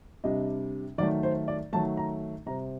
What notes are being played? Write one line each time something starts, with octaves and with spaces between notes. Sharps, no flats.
C3 G3 D4 D#5
D#3 F#3 A3 D5
C5
D5
D#3 F#3 A3 A5
A#5
C3 G3 C4 A#5